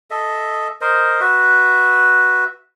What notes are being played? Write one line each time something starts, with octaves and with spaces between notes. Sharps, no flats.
A4 D#5 E5
A#4 C5 D#5
F#4 B4 E5